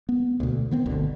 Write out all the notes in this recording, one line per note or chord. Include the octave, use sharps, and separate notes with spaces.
B3
D2 B2
D#3 B3 C4
G1 D2 B2 D3